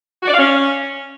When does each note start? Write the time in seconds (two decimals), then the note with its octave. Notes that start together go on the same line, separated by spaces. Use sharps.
0.23 F#4
0.28 D5
0.33 F5
0.38 C#4